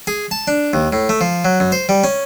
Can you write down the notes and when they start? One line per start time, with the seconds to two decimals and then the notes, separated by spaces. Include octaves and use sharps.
0.07 G#4
0.31 A5
0.47 D4
0.73 D#2
0.92 A2
1.09 A3
1.21 F3
1.45 F#3
1.60 F#2
1.72 C5
1.89 G3
2.04 C#4